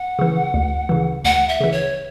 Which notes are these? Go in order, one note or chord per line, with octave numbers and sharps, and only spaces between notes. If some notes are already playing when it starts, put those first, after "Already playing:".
Already playing: F#5
C#3 E3
D2
C#3 E3
D2 F#5
E5
C#3 E3
C#5